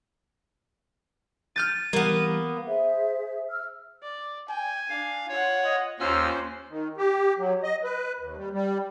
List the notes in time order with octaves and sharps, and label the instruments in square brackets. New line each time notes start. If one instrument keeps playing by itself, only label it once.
[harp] F6 G6 A6 [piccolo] D#7
[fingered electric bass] E3 G3 [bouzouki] A#3 B3
[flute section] G#4 C5 E5
E6 F6
[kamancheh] D5
[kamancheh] G5 [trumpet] G#5
[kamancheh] D4 [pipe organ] F5
[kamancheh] F4 F#5 [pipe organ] C#5
[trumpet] D#5
[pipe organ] D#2 E6 F6 [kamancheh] C#4 C5 [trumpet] F4
[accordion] D#3
G4
F#3
D#5
B4
D#2
G3
G3